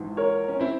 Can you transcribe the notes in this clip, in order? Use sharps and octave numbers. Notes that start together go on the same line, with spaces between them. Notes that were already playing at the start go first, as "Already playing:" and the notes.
Already playing: A#1 G#2 E3
A#4 C#5
C#4
C4 E4